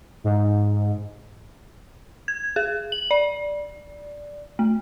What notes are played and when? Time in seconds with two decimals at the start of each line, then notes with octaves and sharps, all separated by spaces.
0.24 G#2
2.28 G#6
2.56 G#4
2.92 F#7
3.11 D5
4.59 A3